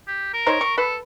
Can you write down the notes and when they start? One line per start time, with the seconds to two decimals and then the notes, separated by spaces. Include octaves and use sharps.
0.07 G4
0.34 A#4
0.46 D#4 C5 C#5
0.61 C#6
0.78 A4 B4